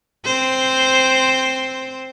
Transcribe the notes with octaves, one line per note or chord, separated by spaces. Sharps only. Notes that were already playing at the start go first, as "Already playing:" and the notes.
C4 C5